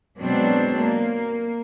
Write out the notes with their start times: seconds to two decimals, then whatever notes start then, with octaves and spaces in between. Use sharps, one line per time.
0.17 B2 F#3 G#3 C4 D4
0.77 A#3